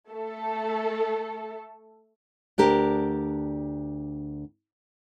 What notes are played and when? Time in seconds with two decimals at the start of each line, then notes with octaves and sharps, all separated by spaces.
0.10 A3 A4
2.58 D2 D4 G4 A#4